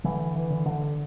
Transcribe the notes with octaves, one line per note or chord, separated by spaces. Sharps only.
D3 E3
E3
D3
D3